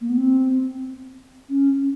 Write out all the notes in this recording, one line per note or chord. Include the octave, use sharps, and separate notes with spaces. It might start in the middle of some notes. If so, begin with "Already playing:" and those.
A#3
B3
C4
C#4